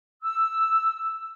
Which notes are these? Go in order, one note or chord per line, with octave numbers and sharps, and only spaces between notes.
E6